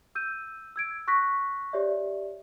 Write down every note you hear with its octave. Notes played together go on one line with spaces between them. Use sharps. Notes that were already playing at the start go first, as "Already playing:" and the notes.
E6 G6 D#7
E6 G#6 D7
C#6 F#6 A#6 B6
G4 C#5 D5 E5